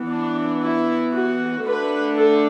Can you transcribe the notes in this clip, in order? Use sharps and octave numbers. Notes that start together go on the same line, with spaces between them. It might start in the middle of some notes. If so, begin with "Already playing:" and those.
Already playing: E3 B3
D4
E4
F#4
D3 A3 D4 B4
A4